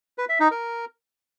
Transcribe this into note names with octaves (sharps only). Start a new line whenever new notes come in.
B4
E5
D#4
A#4